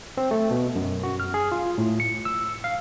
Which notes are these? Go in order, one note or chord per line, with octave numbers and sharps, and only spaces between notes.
C4
A3
B2
F#2
F#4
F6
G#4
F4
A2
C#7
E6
F5